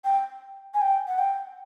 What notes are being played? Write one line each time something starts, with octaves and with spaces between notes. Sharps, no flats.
G5
G#5
G5
F#5
G5